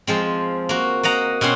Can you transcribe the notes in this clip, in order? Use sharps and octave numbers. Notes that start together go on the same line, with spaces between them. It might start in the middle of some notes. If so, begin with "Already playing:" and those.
F3 G#3 C4
A#3 F#4
A#3 D#5 F#5 A#5
B2 C4 C#4 F#5 C6